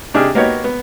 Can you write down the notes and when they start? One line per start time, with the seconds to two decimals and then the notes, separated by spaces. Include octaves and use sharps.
0.14 C3 D4 D#4 G4 G#4 F6
0.35 A#3 B3 D#4 F#4 G4 C#5
0.64 B3